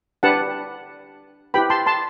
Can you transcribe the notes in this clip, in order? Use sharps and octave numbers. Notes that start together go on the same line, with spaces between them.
D4 G4 B4 F#5 A5
E4 G4 B4 G5 B5
A5 C6
A5 C6